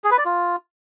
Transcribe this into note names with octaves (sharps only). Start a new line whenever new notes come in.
G#4
B4
D5
F4